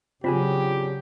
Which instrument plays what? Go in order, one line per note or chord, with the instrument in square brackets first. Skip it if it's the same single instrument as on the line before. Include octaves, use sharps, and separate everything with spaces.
[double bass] C#3 F#3 [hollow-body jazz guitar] C4 D4 G#4 [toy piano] F4 [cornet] G4